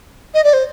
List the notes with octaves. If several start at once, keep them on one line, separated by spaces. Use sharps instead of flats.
D#5
D5
C5